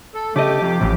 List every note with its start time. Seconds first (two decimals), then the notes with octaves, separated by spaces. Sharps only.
0.14 A4
0.36 C#3 A3 G4 D#5 D6
0.62 F2 C3
0.81 A1 F2 A2